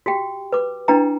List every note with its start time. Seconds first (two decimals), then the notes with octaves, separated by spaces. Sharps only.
0.06 F#4 G4 G5
0.52 B4 D6
0.88 D4 E4 B4 G5 A#5